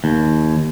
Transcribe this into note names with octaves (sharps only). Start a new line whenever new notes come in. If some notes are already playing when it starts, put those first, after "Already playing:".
D#2